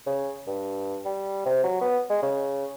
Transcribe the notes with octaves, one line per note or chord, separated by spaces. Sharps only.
C#3
G2
G3
C3
F#3
B3
G#3
C#3